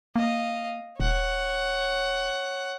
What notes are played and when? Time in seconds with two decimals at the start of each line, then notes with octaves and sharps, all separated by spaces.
0.16 A#3 D#5 F5
1.00 D#1 C#5 F#5